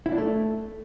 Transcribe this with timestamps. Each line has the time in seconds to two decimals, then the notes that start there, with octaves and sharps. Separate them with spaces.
0.06 E4
0.12 D4
0.18 A3